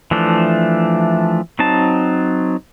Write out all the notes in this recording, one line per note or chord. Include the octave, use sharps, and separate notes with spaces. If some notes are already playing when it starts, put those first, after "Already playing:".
E3 F3 A3 D4
F#3 C4 D#4 A5